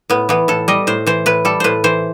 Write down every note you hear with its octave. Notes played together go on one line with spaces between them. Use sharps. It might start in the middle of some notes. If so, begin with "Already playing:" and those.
A2 B3
E3 B3
A2 A4
G3 D#5
A2 C5
E3 C5
A2 B4
G3 A4
A2 B4 C5
E3 C5